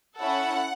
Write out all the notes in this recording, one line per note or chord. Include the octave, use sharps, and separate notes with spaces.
C#4 E4 A4 F#5